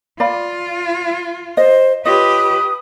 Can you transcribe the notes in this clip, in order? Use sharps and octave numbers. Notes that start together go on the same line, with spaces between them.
F4 D5 F5 B5
C5 D#5
F4 G4 B4 C#5 D#5 D#6